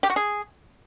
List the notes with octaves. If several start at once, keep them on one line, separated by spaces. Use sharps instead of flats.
G4
F#4
G#4